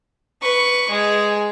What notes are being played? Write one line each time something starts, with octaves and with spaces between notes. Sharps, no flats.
B4 C#6
G#3 G#4